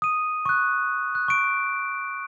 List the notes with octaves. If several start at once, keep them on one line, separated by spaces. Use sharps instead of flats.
D#6 D#7
C#6 F#6
F#6
C#6 D7